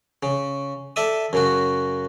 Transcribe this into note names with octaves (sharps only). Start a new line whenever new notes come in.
C#3
A4 D5 E5 D#6
F#2 C#3 F#4